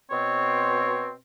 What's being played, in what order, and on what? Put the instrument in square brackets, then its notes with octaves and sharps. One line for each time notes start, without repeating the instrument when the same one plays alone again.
[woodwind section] B2 C4 [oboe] C#5